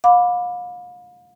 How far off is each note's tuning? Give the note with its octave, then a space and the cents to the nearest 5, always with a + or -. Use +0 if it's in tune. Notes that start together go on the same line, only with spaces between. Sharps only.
F5 +40 B5 +0 D6 +0